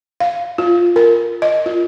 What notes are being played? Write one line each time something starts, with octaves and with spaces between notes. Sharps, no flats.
F5
F4
A#4
D#5
F4